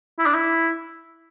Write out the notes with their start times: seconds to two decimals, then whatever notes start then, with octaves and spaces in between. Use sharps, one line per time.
0.19 E4
0.26 D4
0.35 E4